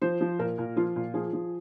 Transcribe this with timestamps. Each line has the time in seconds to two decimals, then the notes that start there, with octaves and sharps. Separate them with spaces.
0.02 F3 C5
0.21 F3
0.39 A#2 A#4
0.58 A#2
0.76 F3 F4
0.96 A#2
1.14 F3 G#4
1.33 F3